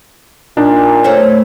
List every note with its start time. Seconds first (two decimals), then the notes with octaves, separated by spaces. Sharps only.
0.57 A#2 D4 D#4
1.04 A3 A#3 C4 C#5